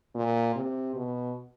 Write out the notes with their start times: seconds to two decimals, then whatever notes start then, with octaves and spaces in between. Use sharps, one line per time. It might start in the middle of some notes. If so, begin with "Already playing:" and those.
0.15 A#2
0.55 C3
0.95 B2